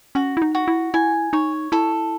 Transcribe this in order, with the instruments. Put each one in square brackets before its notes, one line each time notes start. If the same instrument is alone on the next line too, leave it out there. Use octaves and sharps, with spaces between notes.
[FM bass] C#4 [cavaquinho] F#4
[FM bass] E4
D#4
[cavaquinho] F#4
[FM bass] E4
[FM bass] E4 [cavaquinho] G#5
[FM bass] D#4 [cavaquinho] C#5
[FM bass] E4 [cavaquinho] A4